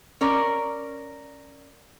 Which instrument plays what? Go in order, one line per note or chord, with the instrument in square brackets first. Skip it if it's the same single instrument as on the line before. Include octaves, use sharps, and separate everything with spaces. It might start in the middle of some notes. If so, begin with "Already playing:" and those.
[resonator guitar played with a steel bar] C#4 A#4 D5